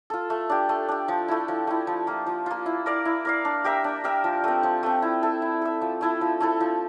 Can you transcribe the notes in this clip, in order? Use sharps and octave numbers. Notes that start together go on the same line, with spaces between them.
F4 A4
A3
D4 G4
A3
D4 G4
F3
A3 E4
F3
A3 E4
F3
A#3 F4
F3
A#3 F4
E4
A#4 D5 F5
E4
A#4 D5 F5
D4
G4 A#4 E5
D4
G4 A#4 E5
F3
A3 C4
F3
A3 C4
E4
A4 E5
E4
A4 E5
F3
A3 E4 A4
F3
A3 E4 A4
F3